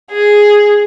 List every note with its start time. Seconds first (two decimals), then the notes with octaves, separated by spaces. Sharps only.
0.12 G#4